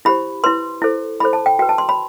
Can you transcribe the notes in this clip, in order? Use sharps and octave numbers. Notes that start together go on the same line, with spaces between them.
E4 G4 C5 B5
E4 B4 C6
E4 A4 C5
E4 A4 C5 B5
A5
G5
F#4 B4 G5
A5
C6
B5